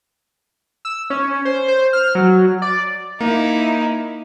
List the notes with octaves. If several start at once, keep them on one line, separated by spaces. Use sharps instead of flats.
E6
C#4
C5
C5
F6
F#3
D5
A#3 D#4 E4